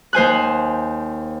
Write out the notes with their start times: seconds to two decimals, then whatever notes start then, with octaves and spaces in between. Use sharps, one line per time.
0.13 D#2 C5 G#5 F#6